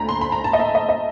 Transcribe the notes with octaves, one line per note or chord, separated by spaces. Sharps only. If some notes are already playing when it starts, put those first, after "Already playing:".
Already playing: D2 D3 A#5 B5
C6
B5
A#5
A5
D#5
E5
D#5
D#5